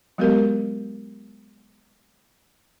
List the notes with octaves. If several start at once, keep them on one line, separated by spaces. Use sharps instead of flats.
F#3 G#3 B3 F#4 G4 A#4